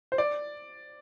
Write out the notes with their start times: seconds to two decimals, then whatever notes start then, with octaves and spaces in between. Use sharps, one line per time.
0.12 C5
0.18 D5